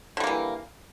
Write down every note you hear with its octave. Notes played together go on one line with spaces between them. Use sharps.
D3 E3 G3 A#3